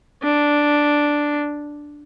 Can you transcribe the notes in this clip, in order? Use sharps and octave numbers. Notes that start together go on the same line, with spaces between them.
D4